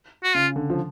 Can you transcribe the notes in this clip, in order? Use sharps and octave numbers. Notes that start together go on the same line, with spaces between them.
F#4
C#3 F4
D3
F3